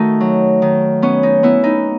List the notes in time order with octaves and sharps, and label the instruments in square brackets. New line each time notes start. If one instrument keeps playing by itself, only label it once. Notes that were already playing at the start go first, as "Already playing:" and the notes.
Already playing: [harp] D#3 A3 D#4 F#4
F#3
D#3
B3 C#4
D#4
B3 E4
D#4